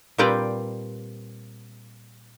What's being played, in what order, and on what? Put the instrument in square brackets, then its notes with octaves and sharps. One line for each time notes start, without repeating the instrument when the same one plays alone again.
[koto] A#2 G3 C4 G4 B4 D5